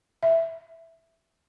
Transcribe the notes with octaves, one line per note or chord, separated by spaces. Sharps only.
E5